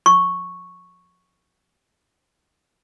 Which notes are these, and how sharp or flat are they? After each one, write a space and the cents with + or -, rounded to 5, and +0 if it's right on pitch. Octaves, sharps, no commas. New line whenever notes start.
C#6 -5